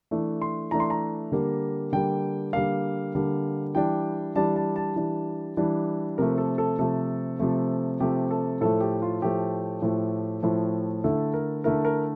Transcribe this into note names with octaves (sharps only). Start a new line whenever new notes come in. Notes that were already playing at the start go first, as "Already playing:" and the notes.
E3 A3 D4
C6
E3 A3 D4 A#5
C6
A#5
D3 G3 A#3
D3 G3 A#3 G5
D3 G3 A#3 F5
D3 G3 A#3
E3 G3 D4 G5
E3 G3 D4 A5
A5
A5
E3 G3 D4
E3 G3 D4
C3 F3 A3 A#4
A4
A4
C3 F3 A3 A4
C3 F3 A3
C3 F3 A3 G4
A4
A2 F3 A3 A4
G4
F4
A2 F3 A3 G4
A2 F3 A3
A2 F3 A3
D3 A3 E4 A4
A#4
D3 A3 E4 A#4
A#4